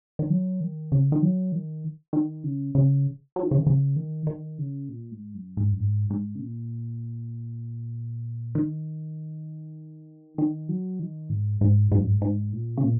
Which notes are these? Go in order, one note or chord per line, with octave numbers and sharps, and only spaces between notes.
D#3
F#3
D#3
C#3
D#3
F#3
D#3
D#3
C#3
C#3
F#3
D#3
C#3
D#3
C#3
D#3
D#3
C#3
A#2
G#2
F#2
G#2
F#2
G#2
G#2
C#3
A#2
D#3
D#3
F#3
D#3
G#2
G#2
G#2
F#2
G#2
G#2
A#2
C#3
A#2